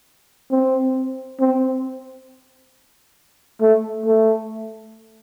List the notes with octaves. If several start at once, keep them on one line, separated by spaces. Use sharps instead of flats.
C4
C4
A3
A3